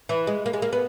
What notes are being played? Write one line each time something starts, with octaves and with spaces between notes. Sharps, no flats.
E3
G#3
A#3
G#3
A#3
B3